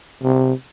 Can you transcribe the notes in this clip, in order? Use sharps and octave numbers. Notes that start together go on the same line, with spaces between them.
C3